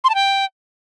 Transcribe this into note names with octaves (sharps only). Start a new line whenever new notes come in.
C6
A5
G5